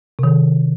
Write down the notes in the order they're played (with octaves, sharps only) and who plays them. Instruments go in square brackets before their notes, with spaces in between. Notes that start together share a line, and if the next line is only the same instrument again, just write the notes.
[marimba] C3 D#3